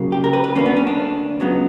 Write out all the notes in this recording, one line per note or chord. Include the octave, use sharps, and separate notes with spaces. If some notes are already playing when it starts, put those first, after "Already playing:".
Already playing: C#2 C#3 F#3 A#3
G4
A#4
B4
B4
D2 D3 A#3 C#4
B3
C#4
D4
C#2 C#3 F#3 B3